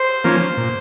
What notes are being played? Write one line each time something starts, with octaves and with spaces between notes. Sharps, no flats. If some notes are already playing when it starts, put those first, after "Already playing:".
Already playing: C5
F3 A#3 C#4
A#2